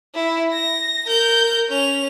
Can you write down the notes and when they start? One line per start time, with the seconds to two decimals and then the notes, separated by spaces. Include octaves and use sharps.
0.15 E4
0.53 A#6
1.06 A#4 G6
1.69 C#4 F7